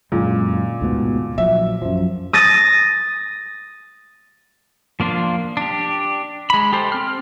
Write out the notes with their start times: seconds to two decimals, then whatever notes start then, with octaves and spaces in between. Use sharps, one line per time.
0.12 F#2 A#2 D3 G#3
0.81 D2 G#2 B2
1.38 A#1 F3 F#3 E5
1.82 F#2 F3
2.33 D#6 A6 A#6 D#7 E7
5.00 F3 A#3 D4 F4
5.57 D4 G4
6.50 G#3 B5
6.73 G4 A4 C5
6.92 C4 F6